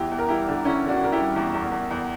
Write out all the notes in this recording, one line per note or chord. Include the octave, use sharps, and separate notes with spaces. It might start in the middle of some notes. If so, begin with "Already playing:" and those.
Already playing: E2 E4 G4
E2
A#4
G3 E4 G4
D3
D3 C#4 E4
D3
D4 F#4
D3 A#4
E4 G4
G3
E2
E2
E2
E2